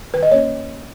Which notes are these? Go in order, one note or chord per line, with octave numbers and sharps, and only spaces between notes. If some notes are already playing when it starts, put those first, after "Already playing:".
D#3 B4
D#5
A#3 C#4 C#5